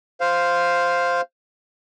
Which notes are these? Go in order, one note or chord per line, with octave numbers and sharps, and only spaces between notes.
C5 F5